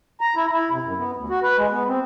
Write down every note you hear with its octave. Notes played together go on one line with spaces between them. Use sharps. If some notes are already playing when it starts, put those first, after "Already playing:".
A#5
E4
E4
C3
F#2
B3
D2
F#4
B4
G#3
B3
C4